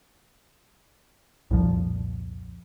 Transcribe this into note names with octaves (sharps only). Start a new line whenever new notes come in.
C2 F2 A#2 F3